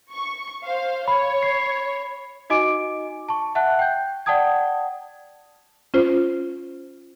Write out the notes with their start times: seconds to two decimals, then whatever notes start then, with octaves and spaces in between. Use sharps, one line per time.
0.13 C#6
0.64 C5 F5
1.08 C#5 B5
1.43 C7
2.50 D#4 F#4 D#5 G#5 D6 D7
3.29 A5 C#6
3.55 E5 F#5 A5 F#6
3.79 G5 G6
4.26 D5 F#5 G5 A5 D#6 G#6
5.94 C#4 F4 C5